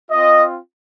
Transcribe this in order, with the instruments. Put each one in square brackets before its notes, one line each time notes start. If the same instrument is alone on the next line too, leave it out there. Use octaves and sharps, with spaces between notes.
[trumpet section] C4 F4 D#5